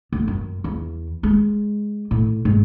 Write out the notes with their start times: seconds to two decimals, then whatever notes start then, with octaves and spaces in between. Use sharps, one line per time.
0.12 D2
0.27 F#2
0.64 E2
1.23 G#3
2.11 A2
2.45 G#2